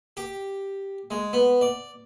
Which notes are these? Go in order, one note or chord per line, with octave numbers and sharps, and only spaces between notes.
G4
G#3
B3
D5